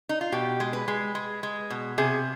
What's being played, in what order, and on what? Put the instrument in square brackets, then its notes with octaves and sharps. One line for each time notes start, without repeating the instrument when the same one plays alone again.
[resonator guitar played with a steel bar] D#4
F4
B2 G4
G#3
B4
G#3
G#3
G#3
B2
C3 G#4